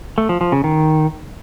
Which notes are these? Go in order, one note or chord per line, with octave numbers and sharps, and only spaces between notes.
A3
F3
F3
C#3
D#3